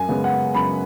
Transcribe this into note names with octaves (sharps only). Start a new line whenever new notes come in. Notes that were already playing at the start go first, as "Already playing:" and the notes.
Already playing: F#2 G#5
C#3 G#3 B3
F#5
F#2 B5